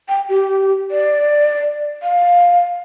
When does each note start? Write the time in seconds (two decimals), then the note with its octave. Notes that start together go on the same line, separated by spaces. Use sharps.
0.09 G5
0.29 G4
0.91 D5
2.03 F5